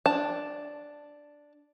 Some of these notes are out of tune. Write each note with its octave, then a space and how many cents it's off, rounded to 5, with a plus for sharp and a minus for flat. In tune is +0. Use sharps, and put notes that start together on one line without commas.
D4 +0 A5 +0